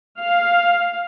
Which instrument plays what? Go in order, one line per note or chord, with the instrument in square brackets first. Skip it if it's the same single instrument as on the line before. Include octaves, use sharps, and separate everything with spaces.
[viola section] F5